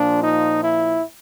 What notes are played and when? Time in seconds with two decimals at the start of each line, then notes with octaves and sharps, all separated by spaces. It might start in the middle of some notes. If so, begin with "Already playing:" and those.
Already playing: A#2 F3 D4
0.24 D#4
0.62 E4